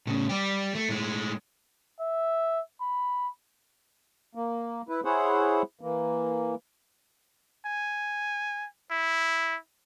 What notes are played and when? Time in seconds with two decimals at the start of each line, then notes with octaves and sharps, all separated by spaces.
0.07 A2 C#3
0.29 G3 G4
0.75 A3
0.89 A2 G#3
2.00 E5
2.81 B5
4.35 A#3
4.89 E4 B4
5.05 E4 G#4 C5 C#5 F#5
5.81 E3 A#3
7.66 G#5
8.91 E4